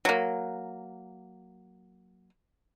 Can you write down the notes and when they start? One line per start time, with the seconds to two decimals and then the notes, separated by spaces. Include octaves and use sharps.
0.05 F#3 A#3